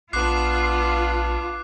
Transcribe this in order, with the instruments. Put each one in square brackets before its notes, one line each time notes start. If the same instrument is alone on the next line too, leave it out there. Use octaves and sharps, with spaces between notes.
[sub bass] A#1 [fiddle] B3 D4 [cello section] F4 [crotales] D6 F#6 C7